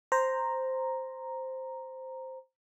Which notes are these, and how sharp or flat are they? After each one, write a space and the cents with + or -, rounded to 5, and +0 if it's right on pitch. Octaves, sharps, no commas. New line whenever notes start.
C5 +0 A#5 +0